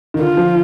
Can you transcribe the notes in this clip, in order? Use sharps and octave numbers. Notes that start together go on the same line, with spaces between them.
D#3
D3 F4
F3